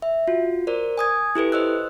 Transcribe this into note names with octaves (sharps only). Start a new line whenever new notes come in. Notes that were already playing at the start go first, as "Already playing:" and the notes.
E5
F4 F#4
A#4 C5 D5
G#5 D#6 G#6
E4 G4 A4 B4
C5 D#5 E6 F#6